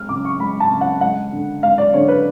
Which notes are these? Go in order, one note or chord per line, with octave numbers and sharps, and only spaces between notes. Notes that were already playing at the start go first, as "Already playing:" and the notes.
Already playing: G#3 F6
C#3 D6
C#6
G#3 B5
A5
C#3
F#5
G#3 F#5
D3
G#3 F5
D5
D3 C#5
B4